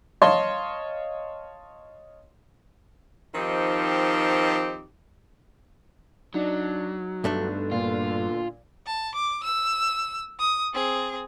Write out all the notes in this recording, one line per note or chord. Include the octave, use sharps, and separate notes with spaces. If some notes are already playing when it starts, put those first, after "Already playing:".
C#5 D#5 F5 A5 C6
D#3 F3 C4 D#4 G4
F#3 D4 D#4
G2 B2 D3 A3 D4
A#2 F4
A5
D6
E6
D#6
C4 G#4